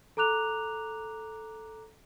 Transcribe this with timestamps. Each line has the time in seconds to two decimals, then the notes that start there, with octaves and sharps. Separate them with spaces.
0.17 A4 A#5 D6 F#6 F7